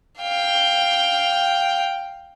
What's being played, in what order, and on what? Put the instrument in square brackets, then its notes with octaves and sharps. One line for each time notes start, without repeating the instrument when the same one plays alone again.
[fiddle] F5 G5